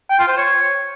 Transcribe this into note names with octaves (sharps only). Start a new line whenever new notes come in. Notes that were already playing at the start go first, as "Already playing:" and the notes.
G5
F4
C5
C#5